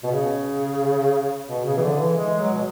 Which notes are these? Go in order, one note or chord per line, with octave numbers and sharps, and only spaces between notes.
B2
C#3
B2
C#3
E3
D3
E3
G#3
F#3
B2